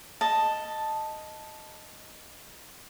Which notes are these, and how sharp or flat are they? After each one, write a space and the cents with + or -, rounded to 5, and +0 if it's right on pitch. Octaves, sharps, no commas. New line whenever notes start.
D#5 +0 A5 +0